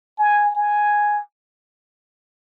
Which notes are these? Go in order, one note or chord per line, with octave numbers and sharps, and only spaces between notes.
G#5
G#5